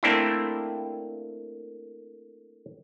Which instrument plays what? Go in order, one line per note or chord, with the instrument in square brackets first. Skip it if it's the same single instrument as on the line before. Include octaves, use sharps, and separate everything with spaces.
[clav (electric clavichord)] A3 A#3 C4 D4 E4